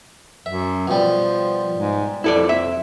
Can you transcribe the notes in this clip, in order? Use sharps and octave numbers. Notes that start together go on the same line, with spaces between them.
F#2 E5
B2 F3 G3
G#2
F2 E4 A4 D5
E5